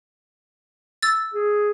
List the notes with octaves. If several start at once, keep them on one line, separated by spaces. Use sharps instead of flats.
E6 A6
G#4